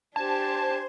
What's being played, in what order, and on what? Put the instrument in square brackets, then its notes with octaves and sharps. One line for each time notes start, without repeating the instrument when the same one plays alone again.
[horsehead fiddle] D4 G4 [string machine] C5 [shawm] G#5 [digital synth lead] A5